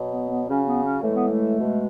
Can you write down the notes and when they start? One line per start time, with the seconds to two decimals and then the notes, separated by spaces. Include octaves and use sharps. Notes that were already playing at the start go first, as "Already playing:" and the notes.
Already playing: B2 F#3
0.11 B3
0.30 B3
0.48 C#3 F#3 C#4
0.66 B3
0.84 C#4
1.02 A2 E3 G#3 A3
1.15 B3
1.28 A3
1.59 B2 G#3